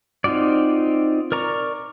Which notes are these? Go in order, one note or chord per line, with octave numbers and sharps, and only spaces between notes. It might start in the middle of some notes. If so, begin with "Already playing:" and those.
C4 D#4 F4 F#4 D5
A#4 D5 A#5 C#6